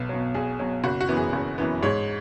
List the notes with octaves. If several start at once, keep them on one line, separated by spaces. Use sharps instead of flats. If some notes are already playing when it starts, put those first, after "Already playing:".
Already playing: B1 B4
B2 F#3
B1 G#4
B2 F#3
F#1 F#4
F#4
F#2 E3 B3
G#4
F#1
F#2 E3 B3
G#2 C#5